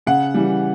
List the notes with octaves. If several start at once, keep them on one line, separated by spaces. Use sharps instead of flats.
C#3 F#5
E3 G3